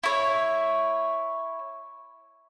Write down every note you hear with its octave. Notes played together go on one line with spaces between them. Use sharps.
E4 C#5